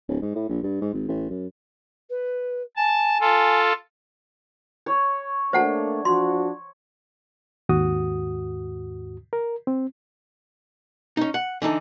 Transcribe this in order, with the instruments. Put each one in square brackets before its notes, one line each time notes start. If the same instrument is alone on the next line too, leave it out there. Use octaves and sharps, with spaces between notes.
[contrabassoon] D1
G#2
A2
A#1
G2
G#2
G#1
A1
F#2
[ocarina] B4
[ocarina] G#5 [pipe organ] A5
[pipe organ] F4 A4
[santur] C#5
[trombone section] A3 A#3 D4 [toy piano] C5 F#5 A5
[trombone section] F3 D4 F#4 [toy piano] C6
[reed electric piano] D#2 G#2 F#4 D#6
A#4
C4
[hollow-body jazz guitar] C#4 D#4
F#5
D3 E3 D#4 A4